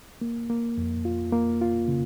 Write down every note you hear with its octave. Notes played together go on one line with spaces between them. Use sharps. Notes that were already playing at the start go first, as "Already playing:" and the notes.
A#3
A#3
F2
F4
A#3
F4
C#3